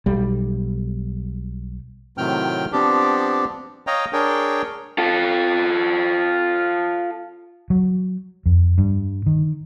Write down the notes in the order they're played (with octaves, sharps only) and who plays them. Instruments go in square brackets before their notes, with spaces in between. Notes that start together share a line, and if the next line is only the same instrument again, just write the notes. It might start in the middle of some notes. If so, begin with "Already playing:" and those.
[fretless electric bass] B1 G3
[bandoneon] A2 C3 D#3 F#3 G5 F6
F3 B3 C4 D4 G4
C#5 D#5 F5 G5 A#5
D4 G#4 A#4 C#5 G5
[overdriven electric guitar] F4 A4
[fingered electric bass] F#3
F2
G2
D#3